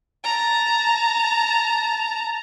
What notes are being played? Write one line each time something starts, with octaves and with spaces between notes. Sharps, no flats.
A5 A#5